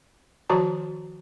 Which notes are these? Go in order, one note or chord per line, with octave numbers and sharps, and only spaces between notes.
D#3 F3 F#4 C#5 A5 A#5